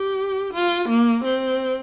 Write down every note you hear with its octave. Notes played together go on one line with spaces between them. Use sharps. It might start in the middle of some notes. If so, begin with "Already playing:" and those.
Already playing: G4
F4
A#3
C4